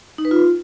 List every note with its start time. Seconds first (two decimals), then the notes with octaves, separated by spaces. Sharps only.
0.18 D#4
0.25 B4
0.31 F4